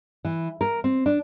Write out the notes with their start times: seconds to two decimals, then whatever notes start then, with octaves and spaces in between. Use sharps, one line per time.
0.25 E3
0.61 A#4
0.84 C4
1.06 D4